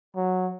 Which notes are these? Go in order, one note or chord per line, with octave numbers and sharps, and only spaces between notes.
F#3